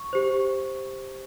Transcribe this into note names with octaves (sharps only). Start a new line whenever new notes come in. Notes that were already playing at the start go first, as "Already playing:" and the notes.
Already playing: C#6
G4 C5